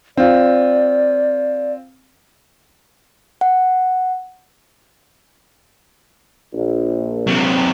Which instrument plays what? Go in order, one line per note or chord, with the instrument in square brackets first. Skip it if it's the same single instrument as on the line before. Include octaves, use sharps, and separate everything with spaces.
[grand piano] C4 F4 [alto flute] D5
[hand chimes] F#5
[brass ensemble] A#1
[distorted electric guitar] C3 F#3